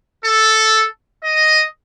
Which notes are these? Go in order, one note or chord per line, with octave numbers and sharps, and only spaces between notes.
A4
D#5